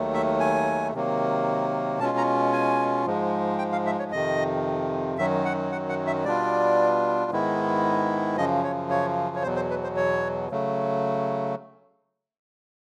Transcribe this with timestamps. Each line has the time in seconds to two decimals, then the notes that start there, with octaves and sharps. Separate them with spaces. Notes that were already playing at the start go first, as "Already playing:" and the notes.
Already playing: D#2 D#3 F#3 A3
0.14 E5
0.40 G#5
0.93 C3 D#3 F#3 A#3
1.99 B2 G#3 C#4 F4 A5
2.17 A#5
2.53 G#5
3.06 G#2 F3 G#3
3.58 G5
3.72 F5
3.86 E5
3.99 C#5
4.12 F2 C3 D#3 D#5
5.18 F#2 D#3 F#3 E5
5.45 F#5
5.72 F#5
5.89 F#5
6.07 E5
6.24 B2 G3 B3 D4 F4 D5
7.31 G#2 D#3 G#3 B3 E4
8.37 F#2 C#3 F3 D#5
8.64 C#5
8.90 C#5
9.36 C#5
9.43 E2 B2 F#3 C5
9.56 C5
9.70 B4
9.83 C5
9.96 C#5
10.50 C#3 F#3 A3